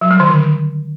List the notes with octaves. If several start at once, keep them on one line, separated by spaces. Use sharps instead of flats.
F#3
G3
D#3
D3